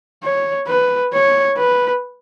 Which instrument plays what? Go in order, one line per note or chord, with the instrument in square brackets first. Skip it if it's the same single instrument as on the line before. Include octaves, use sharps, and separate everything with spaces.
[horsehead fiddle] C#5
B4
C#5
B4